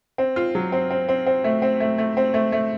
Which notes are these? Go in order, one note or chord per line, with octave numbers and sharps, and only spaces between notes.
C4
F4
F#3
C4
C4
C4
C4
A3
C4
A3
A3
C4
A3
A3